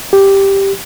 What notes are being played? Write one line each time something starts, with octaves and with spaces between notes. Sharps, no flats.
G4